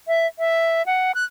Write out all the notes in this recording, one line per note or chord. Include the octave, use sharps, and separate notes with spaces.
E5
E5
F#5
F#6